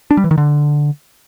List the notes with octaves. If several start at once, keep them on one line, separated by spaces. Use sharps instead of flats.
D4
G3
E3
D#3
D3